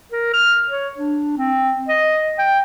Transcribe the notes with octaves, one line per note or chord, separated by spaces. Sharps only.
A#4
F6
C#5
D4
C4
D#5
G5